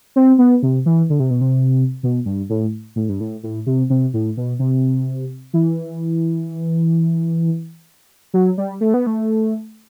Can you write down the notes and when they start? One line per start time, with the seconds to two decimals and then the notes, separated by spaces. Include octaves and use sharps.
0.16 C4
0.38 B3
0.63 C3
0.86 E3
1.10 D3
1.20 C3
1.30 B2
1.41 C3
2.03 B2
2.26 G2
2.50 A2
2.96 A2
3.09 G2
3.20 A2
3.43 A2
3.66 C3
3.90 C3
4.14 A2
4.37 B2
4.59 C3
5.54 E3
8.34 F#3
8.58 G3
8.81 A3
8.94 B3
9.07 A3